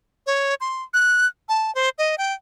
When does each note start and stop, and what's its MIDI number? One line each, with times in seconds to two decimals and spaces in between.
0.27 0.54 73
0.60 0.83 84
0.94 1.27 90
1.49 1.73 81
1.75 1.89 72
1.98 2.15 75
2.18 2.33 79